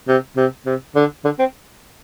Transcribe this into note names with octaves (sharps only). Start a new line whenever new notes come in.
C3
C3
C3
D3
D3
C4